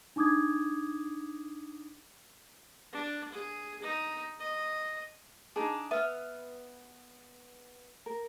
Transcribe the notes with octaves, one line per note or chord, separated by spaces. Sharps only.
D4 D#4 D6 D#6 G#6
D4
G#4
D#4
D#5
D4 D#4 G#4
B3 E5 F6
A#4